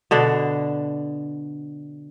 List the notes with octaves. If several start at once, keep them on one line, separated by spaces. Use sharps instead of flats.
B2 D3 D4